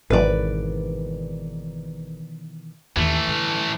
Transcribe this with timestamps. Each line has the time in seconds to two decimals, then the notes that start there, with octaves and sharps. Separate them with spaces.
0.10 G#1 B2 D#3 E3 B4 D5
2.96 D#2 E3 A3
3.27 D3 G3